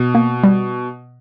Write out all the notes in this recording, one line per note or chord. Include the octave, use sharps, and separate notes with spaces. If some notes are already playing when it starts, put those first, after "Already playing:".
Already playing: B2
A#3
G3